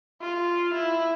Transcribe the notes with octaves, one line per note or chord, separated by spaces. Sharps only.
F4
E4